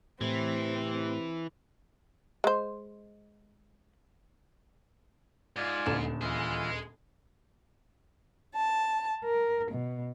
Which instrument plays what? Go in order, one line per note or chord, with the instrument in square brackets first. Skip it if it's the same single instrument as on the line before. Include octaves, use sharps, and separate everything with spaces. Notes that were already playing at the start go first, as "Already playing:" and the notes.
[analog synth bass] A2 [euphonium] C3 [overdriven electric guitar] E3 [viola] C4
[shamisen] G#3 C5
[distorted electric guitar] G#2 [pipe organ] F4 D5 G#5
[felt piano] D#1 D2 E7
[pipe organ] E3 F4 [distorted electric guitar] G#4 D#5
[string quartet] A5
A#4
B2